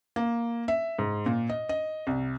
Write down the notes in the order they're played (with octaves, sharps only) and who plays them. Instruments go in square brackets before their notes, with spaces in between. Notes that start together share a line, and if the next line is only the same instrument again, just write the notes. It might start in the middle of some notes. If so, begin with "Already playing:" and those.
[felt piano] A#3
E5
G#2
A#2
D#5
D#5
C2